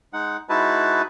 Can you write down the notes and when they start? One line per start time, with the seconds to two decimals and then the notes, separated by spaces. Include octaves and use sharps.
0.13 G#3 D#4 F#5
0.49 G#3 D#4 E4 F#4 B4 A5